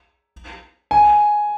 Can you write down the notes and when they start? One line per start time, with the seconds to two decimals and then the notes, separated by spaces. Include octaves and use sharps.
0.91 G#5